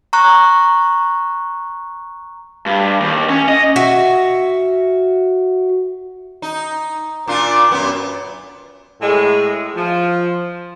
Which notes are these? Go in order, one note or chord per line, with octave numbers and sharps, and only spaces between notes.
A#5 C#6 F#6
G2
D#2
C#4
D#5
F#4 E5
D#4
A#2 D4 F4
F#2 B3
A2 G#3
F3